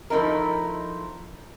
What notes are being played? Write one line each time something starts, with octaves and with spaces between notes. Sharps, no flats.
F3 A3 D#4 E4 A#4